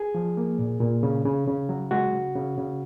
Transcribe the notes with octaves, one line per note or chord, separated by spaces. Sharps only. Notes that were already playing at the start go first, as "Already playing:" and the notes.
Already playing: G#4
F3
A#3
A#2
A#2
C#3
C#3
C#3
F#3
G#3 F#4
C#3
C#3
C#3